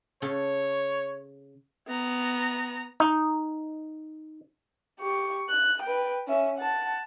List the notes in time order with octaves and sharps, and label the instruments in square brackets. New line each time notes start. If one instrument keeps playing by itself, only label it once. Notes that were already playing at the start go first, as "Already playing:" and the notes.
[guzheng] C#3 A4 [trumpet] C#5
[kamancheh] B3 A#5
[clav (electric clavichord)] D#4
[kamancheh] G4 C#6
F#6
B4 G5
C#4 E5
F#5 A5